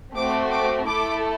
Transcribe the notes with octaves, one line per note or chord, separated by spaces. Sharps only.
A3 C4 F#4 D6
D6
A3 E4 A4 D6